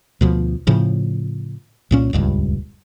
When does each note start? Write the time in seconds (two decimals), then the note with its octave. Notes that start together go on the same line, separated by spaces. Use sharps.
0.21 D2 B2 F3
0.67 A2 C#3 F3
1.91 C2 A#2 C#4
2.13 D#1 C#2 G2